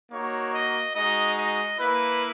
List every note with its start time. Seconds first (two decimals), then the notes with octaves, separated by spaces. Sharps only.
0.11 A#3 D#4 F#4 C#5
0.52 D#5
0.94 G#3 D#4 F#4 D#5
1.36 D#5
1.78 A#3 E4 B4